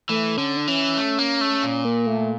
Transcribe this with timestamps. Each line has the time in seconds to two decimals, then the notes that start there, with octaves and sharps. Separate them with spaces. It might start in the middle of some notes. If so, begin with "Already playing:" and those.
0.09 E3 A3
0.37 D3 C#4
0.57 D4
0.67 E3 C#4
0.97 A3
1.18 A#3
1.41 A3
1.63 A#2
1.85 A#3
2.06 A3